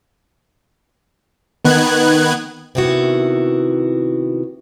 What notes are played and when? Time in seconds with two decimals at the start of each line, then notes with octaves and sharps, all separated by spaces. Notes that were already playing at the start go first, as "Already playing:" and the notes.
1.65 D#3 B3 F#6 G#6
2.75 C3 D#3 B3 E4 F#4